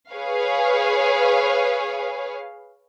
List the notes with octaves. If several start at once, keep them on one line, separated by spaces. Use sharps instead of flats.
G#4 B4 C#5 F5